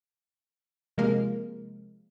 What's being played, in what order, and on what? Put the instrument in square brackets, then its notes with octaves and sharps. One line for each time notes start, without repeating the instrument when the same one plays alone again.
[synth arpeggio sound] C3 F3 G#3 A#3 A#4